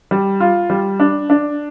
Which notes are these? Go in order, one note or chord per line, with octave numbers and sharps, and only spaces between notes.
G3
F4
G3
D4
D4